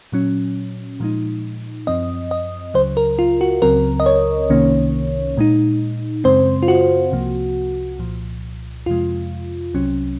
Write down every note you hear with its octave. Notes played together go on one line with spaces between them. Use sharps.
A#2 F#3 C#4
A#2 F3 G#3 D#4
F#2 F3 C4 D#5
D#5
C#2 C#3 F#3 C5
A#4
F4
F#4
C#2 C#3 F#3 C4 A#4
D#5
C#5
C2 C3 D#3 A#3 C#4
A#2 G#3 D#4
F#2 C#3 G#3 C4 C5
F4
F#4
C2 C3 F3 A#3
C2 A#2 F3
F2 C3 F3 G#3 F4
C2 C3 F#3 C#4